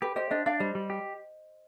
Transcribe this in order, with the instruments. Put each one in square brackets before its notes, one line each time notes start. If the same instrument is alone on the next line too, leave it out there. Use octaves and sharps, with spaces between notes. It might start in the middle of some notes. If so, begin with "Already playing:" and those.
[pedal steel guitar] G4 [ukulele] B4
[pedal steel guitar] G4 [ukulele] C5 D#5
[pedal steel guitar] D4 [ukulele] C5 D#5
[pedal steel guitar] D4 [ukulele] D5 F5
[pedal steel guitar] G3 [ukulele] C5 D#5
[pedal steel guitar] G3
G4